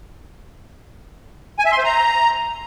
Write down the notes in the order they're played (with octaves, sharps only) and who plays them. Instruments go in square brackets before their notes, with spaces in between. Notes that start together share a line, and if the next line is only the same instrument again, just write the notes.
[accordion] G#5
E5
C6
C5
A#5